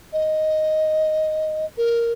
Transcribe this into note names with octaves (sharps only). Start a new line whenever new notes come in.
D#5
A#4